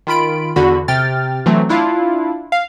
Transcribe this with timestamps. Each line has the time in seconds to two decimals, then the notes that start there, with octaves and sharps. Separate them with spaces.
0.07 D#3 F4 B5 D7
0.56 E2 D3 F#4 B5
0.88 C3 G5 F6 A6
1.46 E3 F#3 A3 C4
1.69 D4 E4 F4 F5
2.52 F5